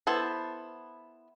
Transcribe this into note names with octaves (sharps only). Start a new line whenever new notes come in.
B3 E4 A4 C5